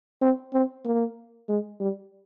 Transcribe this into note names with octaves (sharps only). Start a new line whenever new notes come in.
C4
C4
A#3
G#3
G3